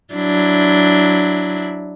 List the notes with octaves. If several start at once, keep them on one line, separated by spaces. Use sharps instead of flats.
F#3 D4 E4